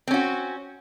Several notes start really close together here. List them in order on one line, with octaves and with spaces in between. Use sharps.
C4 C#4 F#4